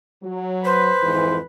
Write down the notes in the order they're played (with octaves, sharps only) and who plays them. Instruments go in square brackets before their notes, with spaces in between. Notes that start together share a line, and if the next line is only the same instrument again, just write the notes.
[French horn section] F#3
[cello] B4 [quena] C5
[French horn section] F2 G#2 E3